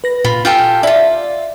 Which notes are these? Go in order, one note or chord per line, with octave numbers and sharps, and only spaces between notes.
B4 A#6
A#2 F4 B5
F4 G4 A4 G#5 F6 G6
E4 F4 D5 E5